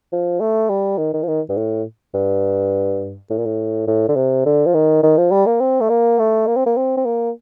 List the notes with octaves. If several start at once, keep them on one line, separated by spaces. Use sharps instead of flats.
F3
A3
G3
D#3
D#3
F3
D#3
G2
A2
G2
A2
A#2
A2
A2
D3
C3
D3
F3
D#3
D#3
F3
G3
A#3
C4
A3
A#3
A3
A#3
C4
A#3
C4
C4
A#3